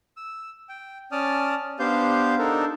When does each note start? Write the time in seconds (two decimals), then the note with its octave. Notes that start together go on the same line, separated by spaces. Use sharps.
0.17 E6
0.69 G5
1.12 C#4 D5 A5 D#6 F6
1.79 B3 D4 G4 C5 F5 G6
2.39 D4 D#4 A4 A#4